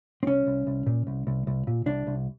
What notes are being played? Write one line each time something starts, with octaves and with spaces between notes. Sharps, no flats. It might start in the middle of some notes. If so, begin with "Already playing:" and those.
C4
C2 C#4
C2
C2
A#2
C2
C2
C2
A#2
C2 D4
C2